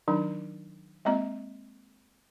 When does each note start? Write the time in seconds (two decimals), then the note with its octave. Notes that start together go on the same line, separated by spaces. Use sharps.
0.08 D#3 F#3 D4 D#4
1.05 G#3 A#3 C4 D#5 A#5